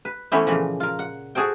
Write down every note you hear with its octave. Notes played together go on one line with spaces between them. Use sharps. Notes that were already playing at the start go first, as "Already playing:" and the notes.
B4
E3 A3 B3 C#4 E4 C5
A#2 C#3 E3 F3
F4 A#4
F#5
F#4 G#4 A4 C5 G5